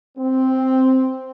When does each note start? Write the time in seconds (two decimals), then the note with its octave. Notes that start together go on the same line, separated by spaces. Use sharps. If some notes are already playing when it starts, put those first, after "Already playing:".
0.18 C4